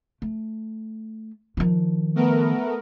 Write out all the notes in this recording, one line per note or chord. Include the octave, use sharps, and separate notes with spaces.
A3
D#3 F3
A3 B3 A#4